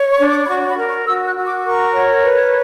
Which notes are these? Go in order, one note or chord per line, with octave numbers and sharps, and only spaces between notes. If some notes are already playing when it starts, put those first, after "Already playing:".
Already playing: C#5
C#6
D4
D6
B5
F#4 C#6
B5
A#4
C#6
F#4 E6
F#6
F#4
D6
A#4 C#6
C#5
B4